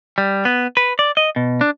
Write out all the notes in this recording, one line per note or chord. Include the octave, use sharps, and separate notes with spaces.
G3
B3
B4
D5
D#5
B2
D4